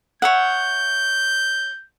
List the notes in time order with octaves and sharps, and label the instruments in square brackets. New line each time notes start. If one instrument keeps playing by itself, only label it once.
[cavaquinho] C#5 E5 F#5 [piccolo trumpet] G6